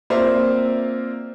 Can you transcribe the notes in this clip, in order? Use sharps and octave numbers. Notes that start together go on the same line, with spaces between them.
A#3 C4 F4 C5 D5 E5